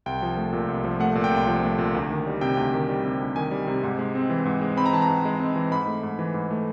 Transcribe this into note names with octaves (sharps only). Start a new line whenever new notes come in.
C2 G5
F3
A3
A#2
C2
F3
A3 F#5
A#2
G5
C2
F3
A3
A#2
D2
D#3
G3
C3 G5
D2
D#3
G3
C3
D2
D#3 G#5
G3
C3
G#2
G#3
C4
E3
G#2
G#3
C4 B5
A#5
E3 A5
A#5
G#2
G#3
C4
E3
G#2 B5
A3
G#2
E3
G#2
A3